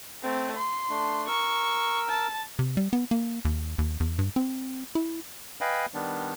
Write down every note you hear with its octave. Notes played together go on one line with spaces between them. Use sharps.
A3 C4
C6
A3 D4
A#4 C#6 E6
A5
C3
G3
B3
A#3
D#2
D#2
E2
G2
C4
E4
B4 D#5 F5 G5 G#5 B5
D#3 G3 B3 D4